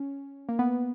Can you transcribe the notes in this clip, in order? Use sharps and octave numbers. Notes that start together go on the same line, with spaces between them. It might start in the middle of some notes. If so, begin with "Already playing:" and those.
Already playing: C#4
A#3
B3